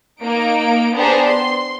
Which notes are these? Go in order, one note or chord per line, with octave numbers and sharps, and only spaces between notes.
A#3 D#4 D7
B3 D4 G4 G#4 C5 A#5
C6